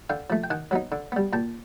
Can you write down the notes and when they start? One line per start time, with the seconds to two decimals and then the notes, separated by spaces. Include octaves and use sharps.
0.10 D3 F5 G5
0.30 F3 A3
0.44 G5
0.50 D#3 F#5 G#5
0.71 F#3 B3 D#4
0.92 D3
1.12 G3 B3
1.33 A#2 G5 A5